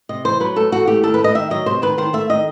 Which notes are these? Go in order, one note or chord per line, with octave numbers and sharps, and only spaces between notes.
C3 D#5
E3 C5
F#3 B4
A3 A4
E3 F#4
A3 G4
D#3 A4
A3 B4
D#5
D#3 E5
F#3 D#5
C3 C5
D#3 B4
D#3 C5
A3 E5
D#3 D#5